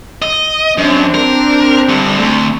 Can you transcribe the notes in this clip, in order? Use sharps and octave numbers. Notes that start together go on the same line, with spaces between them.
D#5
F#2 C4 D4
A#4
G2 D3
D2